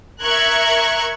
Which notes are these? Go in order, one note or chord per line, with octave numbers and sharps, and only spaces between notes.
A#4 E5 C#6 F#6 G#6